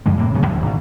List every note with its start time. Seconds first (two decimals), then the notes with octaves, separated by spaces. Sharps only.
0.06 F#1 F#2 F3 G#3
0.17 A2 C3 G3 A#3
0.34 D1 C#3 F#3 B3
0.46 A1 D2 G2 B2
0.62 G#1 B2